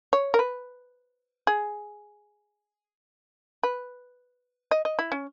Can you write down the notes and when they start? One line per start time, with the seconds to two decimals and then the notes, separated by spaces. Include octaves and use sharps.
0.13 C#5
0.34 A#4
0.39 B4
1.47 G#4
3.63 B4
4.71 D#5
4.85 D#5
4.99 E4
5.12 C#4